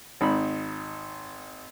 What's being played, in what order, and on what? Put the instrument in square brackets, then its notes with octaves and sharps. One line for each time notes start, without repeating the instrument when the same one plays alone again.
[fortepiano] G#1 D#4 B5